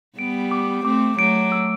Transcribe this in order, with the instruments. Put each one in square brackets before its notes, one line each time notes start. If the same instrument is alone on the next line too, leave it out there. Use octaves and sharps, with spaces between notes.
[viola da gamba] G3 B3 [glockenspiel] D7
[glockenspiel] D6
[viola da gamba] A3 C4 [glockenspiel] D6
[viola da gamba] F#3 A3 [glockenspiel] D7
[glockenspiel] E6